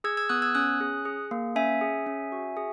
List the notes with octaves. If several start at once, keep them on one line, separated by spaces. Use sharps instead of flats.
G#4 E6 G#6
E6 G#6
B3 D#6 F#6
E6 G#6
C#4 D#6 F#6
G#4
G#4
A#3
C#4 E5 G#5
G#4
C#4
F#4
G#4